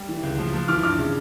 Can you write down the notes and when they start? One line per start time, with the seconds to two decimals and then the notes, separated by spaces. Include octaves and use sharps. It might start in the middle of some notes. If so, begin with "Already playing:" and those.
Already playing: G3
0.09 E3
0.23 C#2
0.39 F3
0.54 F3
0.68 E3 D6 F6
0.83 G2 D6 F6
0.98 C#3